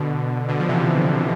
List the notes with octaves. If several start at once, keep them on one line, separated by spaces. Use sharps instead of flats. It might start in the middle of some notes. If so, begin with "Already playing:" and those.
Already playing: B2 D3
B2 D3
F3
C3 E3